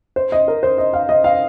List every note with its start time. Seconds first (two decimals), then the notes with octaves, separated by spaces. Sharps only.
0.16 C5
0.32 D#5
0.48 A#4
0.63 C5
0.78 D#5
0.93 F5
1.09 D#5
1.24 F5